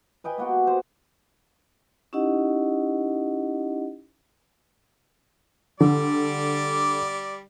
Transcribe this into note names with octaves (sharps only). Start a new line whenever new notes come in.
B4 D#5 G5 G#5
A#3 B3 F#4 G4
C5
C#4 D#4 E4 G4 D#5 F#5
D3 G3 D5